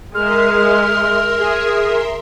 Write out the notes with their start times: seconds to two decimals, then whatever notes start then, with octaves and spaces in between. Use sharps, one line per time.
0.15 G#3 A#4 E5 C6 F6
1.41 G#4